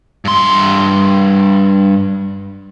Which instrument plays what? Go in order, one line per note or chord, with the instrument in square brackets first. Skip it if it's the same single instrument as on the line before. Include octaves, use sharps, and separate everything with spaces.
[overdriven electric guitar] G2 C6